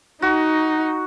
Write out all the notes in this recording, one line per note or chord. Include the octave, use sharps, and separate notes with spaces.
D#4 F#4